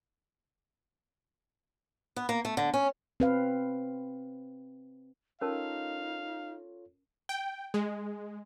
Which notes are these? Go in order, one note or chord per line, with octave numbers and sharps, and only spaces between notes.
B3
A#3
A3
D3
C#4
C4 B4 F5
C#4 D#4 F4 A4 A#4 C#5 F5 A5
G5
G#3